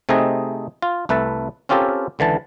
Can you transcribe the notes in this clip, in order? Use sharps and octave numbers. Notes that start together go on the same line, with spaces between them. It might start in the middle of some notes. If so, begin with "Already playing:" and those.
C3 A3 C4 D#4 G#4 D#5
F4
C2 A3 B4 E5 A5
C4 C#4 F4 G4 A4 A#4
C#2 D3 E3 A5